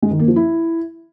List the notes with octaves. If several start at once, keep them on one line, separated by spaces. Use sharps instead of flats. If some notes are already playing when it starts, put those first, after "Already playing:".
G#3
D#3
A#3
F3
E4